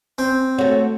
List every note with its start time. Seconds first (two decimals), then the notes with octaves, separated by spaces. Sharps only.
0.18 C4
0.58 A3 F#4 C#5